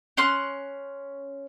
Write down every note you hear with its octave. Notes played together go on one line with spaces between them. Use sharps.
C#4 C6 F#6